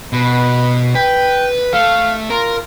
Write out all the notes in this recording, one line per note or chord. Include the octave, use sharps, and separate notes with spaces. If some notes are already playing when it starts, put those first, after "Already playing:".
B2 B4
B4 G5
A3 F5
F4 A#4